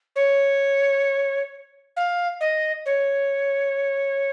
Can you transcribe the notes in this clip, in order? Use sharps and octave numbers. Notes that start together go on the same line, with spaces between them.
C#5
F5
D#5
C#5